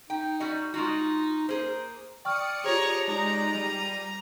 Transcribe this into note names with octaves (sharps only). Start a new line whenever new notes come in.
D#4 G5
G3 F#4 D#5
G#3 D#4 F4 F#4
A#3 G#4 C5
D5 G5 C#6 D#6 F6 C#7
F4 G4 G#4 C#5 A#5
G#3 D#4 D5 A#5
G3 D#7